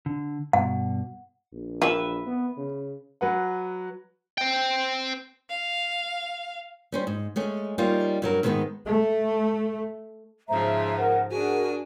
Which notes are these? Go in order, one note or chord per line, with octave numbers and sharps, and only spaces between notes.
D3
G2 B2 F#5
A#1
E3 A#3 G4 B4 E5
B3
C#3
F#3 B4 F#5
C5 G5
F5
G3 C#4 C5
G#2
G#3 A3 C#4
G3 A#3 C#4 D#4 F4
G2 F#3 A#4
G#2 D#3 G3 G#3 B3 C4
A3
G#2 C#3 F3 C5 E5 A#5
A#4 F#5
D4 F#4 G#4 A#4 G#5